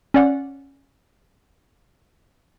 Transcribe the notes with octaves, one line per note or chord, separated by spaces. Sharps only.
C#4 D5 F#5